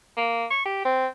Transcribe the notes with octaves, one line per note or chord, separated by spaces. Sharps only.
A#3
C#6
G4
C4